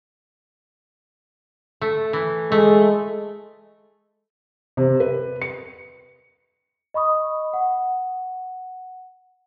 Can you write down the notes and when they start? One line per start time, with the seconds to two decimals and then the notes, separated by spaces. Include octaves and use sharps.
1.81 A3
2.13 E3
2.52 G#3 A3
4.77 C3
5.00 B4
5.42 C#7
6.94 D#5 B5 C#6 D#6
7.53 F#5